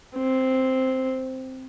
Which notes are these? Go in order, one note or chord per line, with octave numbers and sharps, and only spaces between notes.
C4